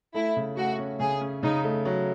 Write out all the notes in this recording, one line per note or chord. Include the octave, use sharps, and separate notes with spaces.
A3 E4
C#3
A3 F#4
C#4
C#3 G#4
C#4
C#3 D#4
A3
F#3